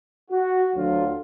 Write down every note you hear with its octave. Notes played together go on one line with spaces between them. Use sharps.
F#4
D2 D3 F#3 F4